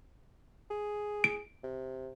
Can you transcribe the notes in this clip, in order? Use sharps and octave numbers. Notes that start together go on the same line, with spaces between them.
G#4
D7
C3